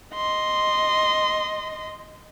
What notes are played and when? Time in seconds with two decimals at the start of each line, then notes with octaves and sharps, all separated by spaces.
0.15 D#5 C6